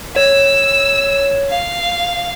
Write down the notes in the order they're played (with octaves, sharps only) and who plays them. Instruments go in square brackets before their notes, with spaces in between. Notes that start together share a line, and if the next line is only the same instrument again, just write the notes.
[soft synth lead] C#5 [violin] E6
[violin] F5